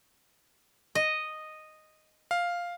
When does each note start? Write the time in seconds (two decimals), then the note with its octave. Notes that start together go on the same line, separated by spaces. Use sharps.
0.95 D#5
2.31 F5